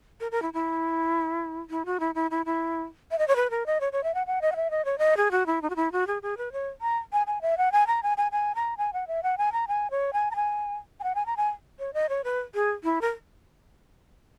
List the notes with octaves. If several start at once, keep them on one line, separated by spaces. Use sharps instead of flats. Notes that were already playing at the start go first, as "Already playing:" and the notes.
A#4
A#4
E4
E4
E4
F#4
E4
E4
E4
E4
E5
D#5
C#5
B4
A#4
D#5
C#5
C#5
E5
F#5
F#5
D#5
F#5
E5
D#5
C#5
D#5
G#4
F#4
E4
D#4
F#4
E4
F#4
G#4
G#4
B4
C#5
A#5
G#5
G#5
E5
F#5
G#5
A#5
G#5
G#5
G#5
A#5
G#5
F#5
E5
F#5
G#5
A#5
G#5
C#5
G#5
A#5
G#5
G#5
F#5
G#5
A#5
G#5
C#5
D#5
C#5
B4
G#4
E4
A#4